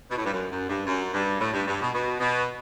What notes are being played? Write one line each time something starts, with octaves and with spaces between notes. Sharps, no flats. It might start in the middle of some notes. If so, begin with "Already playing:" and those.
B2
A2
G2
F#2
F#2
G2
F#2
G2
A2
G2
G2
B2
B2
B2